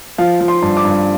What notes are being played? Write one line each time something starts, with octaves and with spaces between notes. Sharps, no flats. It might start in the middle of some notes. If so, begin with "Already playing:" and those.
F3 F5
F3
C6
G2
D6
G2